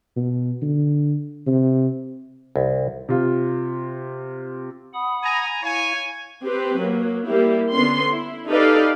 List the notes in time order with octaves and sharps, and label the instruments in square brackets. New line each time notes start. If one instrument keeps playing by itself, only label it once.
[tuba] B2
D3
C3
[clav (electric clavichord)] C2
[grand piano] C3 F4
[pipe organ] F#5 B5 D#6
[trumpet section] G#5 A#5
[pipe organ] E4 F5 [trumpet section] C#5 G#5
[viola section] C4 G4 B4
F#3 A#3
G3 A#3 E4 G4
D3 B3 C#4 C6
E4
D#4 G4 A4 B4 D5 F5